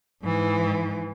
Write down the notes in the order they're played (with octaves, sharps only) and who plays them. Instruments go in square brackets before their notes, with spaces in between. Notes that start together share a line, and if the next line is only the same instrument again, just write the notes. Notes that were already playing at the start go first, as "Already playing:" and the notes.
[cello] G#2 E3